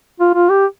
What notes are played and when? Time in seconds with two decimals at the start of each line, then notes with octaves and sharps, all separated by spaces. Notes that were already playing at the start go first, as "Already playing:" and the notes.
0.20 F4
0.35 F4
0.50 G4